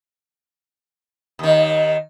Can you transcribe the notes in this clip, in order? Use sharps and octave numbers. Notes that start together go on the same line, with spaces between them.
D#2 D#3